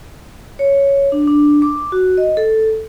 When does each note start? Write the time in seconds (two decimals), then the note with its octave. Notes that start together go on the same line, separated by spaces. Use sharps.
0.59 C#5
1.12 D4
1.27 D4
1.62 D6
1.92 F#4
2.18 D#5
2.37 A4